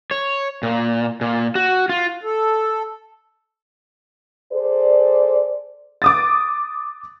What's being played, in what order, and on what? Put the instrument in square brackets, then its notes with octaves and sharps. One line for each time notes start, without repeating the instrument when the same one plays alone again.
[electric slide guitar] C#5
A#2
A#2
F#4
F4
[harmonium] A4
[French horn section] G#4 A4 C5 D5
[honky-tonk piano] D6 D#6 A6